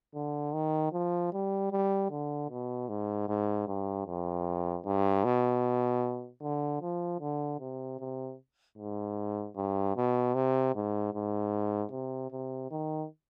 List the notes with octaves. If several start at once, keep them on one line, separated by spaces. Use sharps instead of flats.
D3
D#3
F3
G3
G3
D3
B2
G#2
G#2
G2
F2
G2
B2
D3
F3
D3
C3
C3
G#2
G2
B2
C3
G#2
G#2
C3
C3
D#3